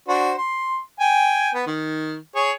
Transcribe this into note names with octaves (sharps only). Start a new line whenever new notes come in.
D4 F#4 C5
C6
G5 G#5
B3 B4
D#3
G#4 C#5